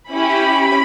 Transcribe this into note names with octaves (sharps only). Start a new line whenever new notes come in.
C#4 E4 G4 B5